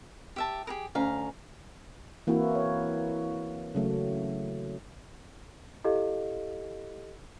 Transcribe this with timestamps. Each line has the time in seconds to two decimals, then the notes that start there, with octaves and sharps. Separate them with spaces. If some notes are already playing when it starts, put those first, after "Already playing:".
0.36 G4 E5 A5
0.67 G4 G#4 A#4
0.95 D2 C#4 F5 A#5
2.27 E3 A#3 C4 E4 F#4
2.55 C#5
3.75 C#3 F#3 A3
5.84 E4 G4 A4 D#5 F5